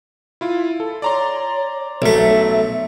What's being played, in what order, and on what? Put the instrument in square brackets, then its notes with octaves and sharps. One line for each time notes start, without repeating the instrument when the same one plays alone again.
[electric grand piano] E4 F4
A4
[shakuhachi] C#5 [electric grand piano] D5 A#5 C6
[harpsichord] B1 A3 [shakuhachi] E5